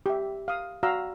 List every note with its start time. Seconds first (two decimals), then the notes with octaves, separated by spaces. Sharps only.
0.06 G4 E5
0.48 F5 D#6
0.83 F#4 D5 F5 A#5 E6